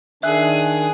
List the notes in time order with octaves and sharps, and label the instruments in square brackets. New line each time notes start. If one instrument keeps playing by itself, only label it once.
[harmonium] D#3 D4 [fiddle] G#4 [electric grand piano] E5 F#6